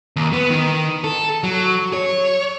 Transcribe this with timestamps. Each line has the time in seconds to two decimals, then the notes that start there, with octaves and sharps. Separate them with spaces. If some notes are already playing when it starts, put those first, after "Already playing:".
0.16 D#2
0.33 B3
0.50 D#3
1.04 A4
1.43 F#3
1.93 C#5